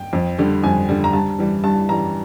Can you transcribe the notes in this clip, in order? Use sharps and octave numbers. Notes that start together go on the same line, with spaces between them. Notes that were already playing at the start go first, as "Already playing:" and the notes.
Already playing: G5
F2
D3 G3
F2 G#5
D3 G3
A#5
G2 A5
E3 G3
G2 A5
E3 G3 A#5